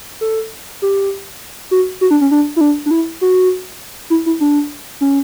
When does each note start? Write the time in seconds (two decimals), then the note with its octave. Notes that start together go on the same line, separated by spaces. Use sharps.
0.21 A4
0.82 G4
1.71 F#4
2.01 F#4
2.11 D4
2.21 C#4
2.31 D4
2.56 E4
2.61 D4
2.86 D4
2.91 E4
3.21 F#4
4.10 E4
4.26 E4
4.41 D4
5.01 C#4